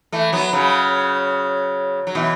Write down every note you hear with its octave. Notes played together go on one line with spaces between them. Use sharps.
E3 A3
F#3 B3
C#3 F#3
F#3
B2 E3